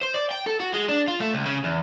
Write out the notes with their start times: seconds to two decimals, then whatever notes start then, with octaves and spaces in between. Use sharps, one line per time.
0.03 C5
0.15 D5
0.31 G5
0.46 A4
0.60 F#4
0.74 G#3
0.88 D4
1.08 F4
1.20 A3
1.33 C#2
1.46 C#3
1.64 E2